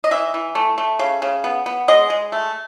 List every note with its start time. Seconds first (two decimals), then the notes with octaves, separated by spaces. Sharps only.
0.04 D#5
0.11 E3 E5
0.34 E3
0.55 A3
0.78 A3
0.99 C#3
1.22 C#3
1.44 B3
1.66 B3
1.88 G#3 D#5
2.10 G#3
2.32 A3